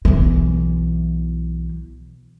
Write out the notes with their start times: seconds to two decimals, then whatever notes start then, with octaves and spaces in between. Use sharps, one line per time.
0.05 B1 E3